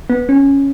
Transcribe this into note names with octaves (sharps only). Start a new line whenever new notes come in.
B3
C#4